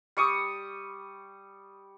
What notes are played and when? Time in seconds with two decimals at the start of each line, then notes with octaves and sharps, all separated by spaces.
0.17 G3 C#6 D#6